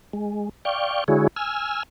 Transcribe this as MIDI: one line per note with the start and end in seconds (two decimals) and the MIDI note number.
0.13 0.49 56
0.65 1.04 74
0.65 1.04 77
0.65 1.04 79
0.65 1.04 85
1.08 1.27 50
1.08 1.27 56
1.08 1.27 64
1.08 1.27 66
1.08 1.27 68
1.08 1.27 73
1.36 1.83 80
1.36 1.83 88
1.36 1.83 89